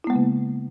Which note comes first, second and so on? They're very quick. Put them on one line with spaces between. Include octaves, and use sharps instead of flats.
E4 B3 G#3 A#3 C#3